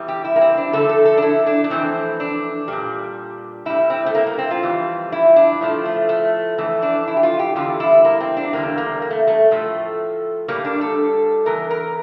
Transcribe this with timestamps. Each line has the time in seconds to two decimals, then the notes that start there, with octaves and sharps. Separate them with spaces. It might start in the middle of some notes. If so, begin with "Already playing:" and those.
Already playing: E2 E3 G3
0.08 G4
0.24 E4
0.36 A#3
0.41 C4
0.57 D4
0.73 F2 D3 A3 A4
0.89 A4
1.05 A4
1.17 D4
1.22 E4
1.46 D4
1.64 D4
1.70 F2 E3 A3 C4
2.20 D4
2.68 A#2 G3
3.66 A2 G3 E4
3.90 C4
4.06 A3
4.15 A#3
4.27 A#3
4.38 C4
4.51 F4
4.63 F2 E3 G3
5.12 E4
5.36 D4
5.61 A2 F3 A3
5.85 A3
6.09 A3
6.58 F2 E3 A3
6.82 D4
7.07 E4
7.17 G4
7.23 F4
7.39 G4
7.56 E2 D3 G3 F4
7.80 E4
8.05 A#3
8.20 C4
8.37 D4
8.53 E2 D3 G3 A#3
8.78 A#3
9.02 A#3
9.10 A3
9.27 A3
9.51 A2 F3 A3
10.48 A2 G3 A#3
10.65 D4
10.81 A4
11.46 E2 E3 A#4
11.70 A#4